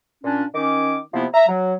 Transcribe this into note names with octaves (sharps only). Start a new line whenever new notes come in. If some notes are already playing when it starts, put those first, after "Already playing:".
A#2 C#4 D4
D#3 C#4 D6
C3 F3 A#3 B3 E4
E5 A#5
F#3